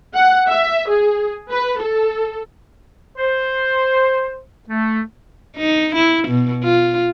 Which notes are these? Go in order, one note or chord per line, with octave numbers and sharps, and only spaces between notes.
F#5
E5
G#4
B4
A4
C5
A3
D#4
E4
B2
F4